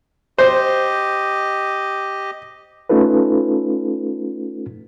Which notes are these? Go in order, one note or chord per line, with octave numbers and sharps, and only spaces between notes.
G4 C5 D#5
A3 C#4 D#4 F4 A4 B4